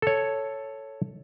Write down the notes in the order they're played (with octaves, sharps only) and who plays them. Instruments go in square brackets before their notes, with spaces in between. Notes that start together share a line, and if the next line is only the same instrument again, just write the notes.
[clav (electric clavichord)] A4 C#5